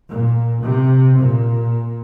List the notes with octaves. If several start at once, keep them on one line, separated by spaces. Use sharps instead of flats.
A#2
C3
A#2